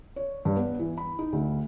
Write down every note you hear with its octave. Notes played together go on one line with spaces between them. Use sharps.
C#5
G2
B3
E3
B5
D#4
D2